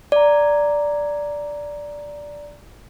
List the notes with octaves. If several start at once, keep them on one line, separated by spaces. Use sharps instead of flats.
D5 A#5